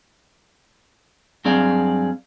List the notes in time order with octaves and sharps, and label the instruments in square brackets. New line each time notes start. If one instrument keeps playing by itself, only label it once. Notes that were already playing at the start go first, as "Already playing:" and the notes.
[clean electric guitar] G2 F#3 C4 G#4 D5 F5